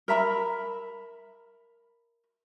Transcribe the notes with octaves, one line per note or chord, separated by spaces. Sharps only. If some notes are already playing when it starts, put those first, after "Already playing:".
A#4 E5 A#5 B5